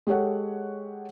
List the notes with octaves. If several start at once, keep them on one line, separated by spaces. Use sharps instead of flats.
G#3 G4 A4 C#5 F#5